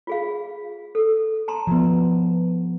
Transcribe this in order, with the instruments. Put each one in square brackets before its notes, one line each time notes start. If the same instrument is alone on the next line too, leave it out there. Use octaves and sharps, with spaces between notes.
[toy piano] F4 G#4 F5
A4
A5 A#5 C6
[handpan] F3 B3